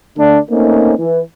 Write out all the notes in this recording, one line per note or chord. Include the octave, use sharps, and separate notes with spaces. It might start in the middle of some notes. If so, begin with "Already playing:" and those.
D3 A3 D4
A3 A#3 C4 C#4 D#4
E3